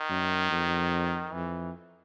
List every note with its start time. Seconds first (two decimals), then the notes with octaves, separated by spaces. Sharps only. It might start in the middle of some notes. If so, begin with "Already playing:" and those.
Already playing: D#3
0.10 F#2
0.51 F2
1.33 F2 E3